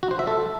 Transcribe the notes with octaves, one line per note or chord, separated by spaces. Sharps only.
F#4
C5
E5
A4